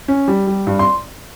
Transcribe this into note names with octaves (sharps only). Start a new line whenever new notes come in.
C#4
G3
G3
G2
C6